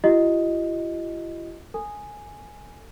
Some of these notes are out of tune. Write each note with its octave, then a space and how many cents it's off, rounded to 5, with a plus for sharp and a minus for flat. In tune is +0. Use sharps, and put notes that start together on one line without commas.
E4 +45 G4 -45 D#5 +5
A4 +40 G#5 +0